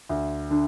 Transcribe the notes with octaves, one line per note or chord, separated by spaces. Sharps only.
D2
D3